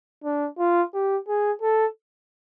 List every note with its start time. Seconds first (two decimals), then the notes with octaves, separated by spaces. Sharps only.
0.24 D4
0.58 F4
0.94 G4
1.28 G#4
1.62 A4